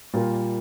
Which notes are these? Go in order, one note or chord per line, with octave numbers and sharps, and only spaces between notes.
A#2 G3 A#3 F4